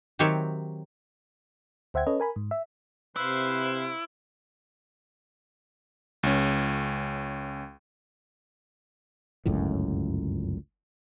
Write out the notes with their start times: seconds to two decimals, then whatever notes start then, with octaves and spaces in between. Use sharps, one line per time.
0.19 D#3 F#3 C4 G4 C#5 E5
1.94 D2 C5 E5 F#5 G5 G#6
2.07 C#4 A4 B4 C#5 D#5
2.20 A#4 G#5 B5
2.36 G#2
2.51 E5
3.16 C3 E4 B4 C5 F5
6.23 C#2 C#4
9.46 G1 C#2 F#2 A2